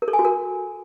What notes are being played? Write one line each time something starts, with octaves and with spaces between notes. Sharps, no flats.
A#4
A4
G#5
F#4
A#4